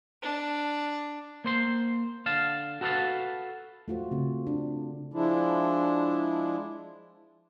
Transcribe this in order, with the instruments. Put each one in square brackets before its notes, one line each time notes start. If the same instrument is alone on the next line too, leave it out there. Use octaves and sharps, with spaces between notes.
[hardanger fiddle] D4
[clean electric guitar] A#3 C5 C6
D3 F5 A5
F#4 A4 B4 D5 F5 A5
[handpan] A3 F4 F#4 C5
C#3 C4
D4
[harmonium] F3 G#3 D4 E4